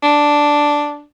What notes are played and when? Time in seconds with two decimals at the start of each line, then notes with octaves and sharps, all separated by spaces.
0.03 D4